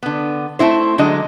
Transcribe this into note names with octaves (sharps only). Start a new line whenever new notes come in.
D3 B3
A3 C4 E4 C5
D3 F#3 G#3 D#5